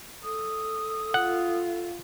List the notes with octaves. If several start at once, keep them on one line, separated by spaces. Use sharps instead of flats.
A4 D#6
F4 F#5